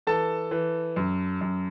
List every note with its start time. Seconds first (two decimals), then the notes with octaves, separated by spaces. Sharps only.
0.07 E3 A4 A5
0.51 E3
0.96 F#2
1.41 F#2